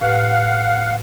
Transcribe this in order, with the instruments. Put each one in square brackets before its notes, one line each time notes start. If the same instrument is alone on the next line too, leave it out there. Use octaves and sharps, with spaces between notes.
[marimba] A2 G4 B4 [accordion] F5 F#5